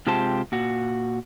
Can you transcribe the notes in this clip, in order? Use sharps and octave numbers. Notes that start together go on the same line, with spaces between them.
C3 G#3 F4 G4 C5 A5
A#2 F#4